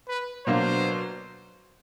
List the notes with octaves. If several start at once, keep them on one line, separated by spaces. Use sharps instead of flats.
B4
B2 F#3 A#3 D4 C5